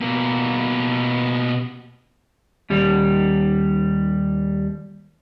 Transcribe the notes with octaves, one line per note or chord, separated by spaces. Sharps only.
B2 A#3
D#2 G3